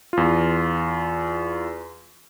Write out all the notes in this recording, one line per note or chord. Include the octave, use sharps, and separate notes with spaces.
E2 F4